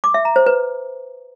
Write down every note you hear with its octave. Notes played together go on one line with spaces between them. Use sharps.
D6
E5
A#5
C5
B4